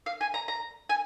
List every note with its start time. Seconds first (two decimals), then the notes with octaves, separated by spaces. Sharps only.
0.06 F5
0.21 G#5
0.34 A#5
0.48 A#5
0.89 G#5